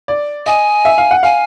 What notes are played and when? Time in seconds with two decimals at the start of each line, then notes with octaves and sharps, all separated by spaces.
0.08 D5
0.46 D#5 G#5
0.85 E5
0.98 F5
1.11 F#5
1.23 F5 G#5